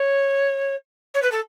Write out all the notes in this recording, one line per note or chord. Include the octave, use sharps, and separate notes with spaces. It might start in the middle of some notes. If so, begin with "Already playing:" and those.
Already playing: C#5
C#5
B4
A4